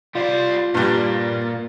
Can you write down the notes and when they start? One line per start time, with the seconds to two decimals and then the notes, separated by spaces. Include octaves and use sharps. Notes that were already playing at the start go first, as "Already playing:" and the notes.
0.15 G3 F4 C5 D5
0.74 G2 A#2 G3